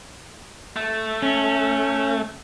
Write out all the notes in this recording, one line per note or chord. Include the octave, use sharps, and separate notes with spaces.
A3
C#4